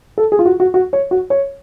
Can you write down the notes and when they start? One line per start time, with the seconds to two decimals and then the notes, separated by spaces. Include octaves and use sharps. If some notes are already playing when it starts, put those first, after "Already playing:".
0.18 A4
0.32 G#4
0.39 F4
0.46 F#4
0.60 F#4
0.74 F#4
0.93 C#5
1.11 F#4
1.30 C#5